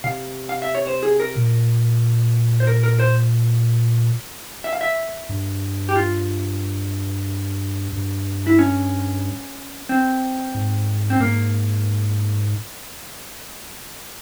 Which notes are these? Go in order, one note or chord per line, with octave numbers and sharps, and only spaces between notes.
C3 F5
F5
E5
C#5
C5
G#4
A#4
A#2
C5
A#4
A#4
C5
E5
F5
E5
G2
G4
F4
G2
E4
C#4
C4
G#2
C4
G#2 A#3